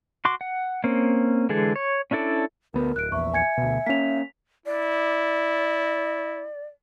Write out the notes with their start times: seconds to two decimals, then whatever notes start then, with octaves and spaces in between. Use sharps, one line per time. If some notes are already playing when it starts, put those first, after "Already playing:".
0.25 F#4 C6 D6
0.41 F#5
0.84 A#3 C4 C#4
1.49 D3 E3 G#3 G#4 A4
1.76 C#5
2.11 C#4 D4 E4 A4 D5
2.74 D2 B3 A#4
2.96 D1 F#6 D7
3.12 A#1 E2 E5 C#6
3.34 G#5 G#6 C#7
3.57 D2 B2
3.86 A#3 C#4 B6 F7
4.66 E4 D5